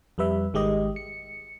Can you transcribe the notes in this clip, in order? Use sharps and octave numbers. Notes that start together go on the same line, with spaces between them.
F2 G3 B4 E5
G#1 D#3 G#3 G4 D#5
C#7